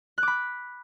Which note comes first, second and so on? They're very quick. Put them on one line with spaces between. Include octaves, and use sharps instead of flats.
F#6 D6 B5